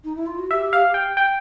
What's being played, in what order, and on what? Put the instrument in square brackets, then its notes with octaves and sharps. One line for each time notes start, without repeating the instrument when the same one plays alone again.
[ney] D#4
E4
F4
F#4
[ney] G4 [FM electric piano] E5
[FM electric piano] F5
G5
G5